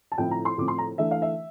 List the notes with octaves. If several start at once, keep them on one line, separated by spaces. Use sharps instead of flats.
A5
A2 F3 C4 E4 G5
A#5
C6
A2 F3 C4 D6
C6
A#5
E3 A3 D4 E5
F5
E5